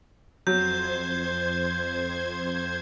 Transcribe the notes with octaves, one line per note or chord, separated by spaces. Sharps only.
F2 F#3 C5 G6 G#6